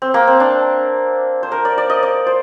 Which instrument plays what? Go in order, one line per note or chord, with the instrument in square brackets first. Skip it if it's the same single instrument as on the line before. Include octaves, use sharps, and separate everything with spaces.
[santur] C4
A#3
C4
D4
C5
A#4
D5
D5
D#5
D5
C5